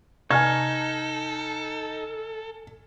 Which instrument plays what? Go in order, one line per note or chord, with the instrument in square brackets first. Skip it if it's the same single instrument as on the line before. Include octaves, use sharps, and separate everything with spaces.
[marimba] C3 [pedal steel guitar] D#4 [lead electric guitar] A4 [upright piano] G#5 F6 G#6